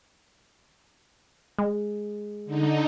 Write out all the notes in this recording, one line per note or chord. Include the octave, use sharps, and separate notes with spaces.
G#3
D3 D#4